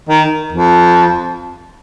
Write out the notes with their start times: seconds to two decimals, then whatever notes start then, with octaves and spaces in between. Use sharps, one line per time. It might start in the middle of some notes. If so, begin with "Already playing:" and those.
0.09 D#3
0.53 F2